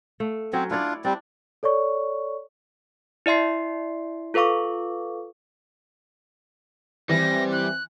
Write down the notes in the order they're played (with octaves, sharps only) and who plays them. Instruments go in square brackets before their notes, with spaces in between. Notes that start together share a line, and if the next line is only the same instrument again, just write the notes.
[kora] A3 F5
[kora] F#3 C#4 [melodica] C4
[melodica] D4 F4 [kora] E4 C#5 D5
[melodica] G3 C4 [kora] D4
[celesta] A4 C#5 D5 C#6
[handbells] E4 D5 E5 C6 C7
F4 A4 B4 F5 C#6 D6
[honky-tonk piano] E3 [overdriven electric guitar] G3 [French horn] C4 [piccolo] A#6
[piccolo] F#6